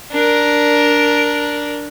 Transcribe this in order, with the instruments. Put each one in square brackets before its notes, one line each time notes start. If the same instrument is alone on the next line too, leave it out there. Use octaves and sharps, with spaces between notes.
[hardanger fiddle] D4 A#4